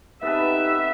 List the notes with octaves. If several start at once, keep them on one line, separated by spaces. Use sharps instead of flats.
B3 C4 D#4 G4 A4 B4 E5